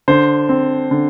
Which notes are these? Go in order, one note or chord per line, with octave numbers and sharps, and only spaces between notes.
D3 C5
C4
D3